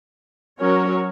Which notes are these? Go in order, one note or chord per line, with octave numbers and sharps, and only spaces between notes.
F#3 C#4 F#4 A#4 C#5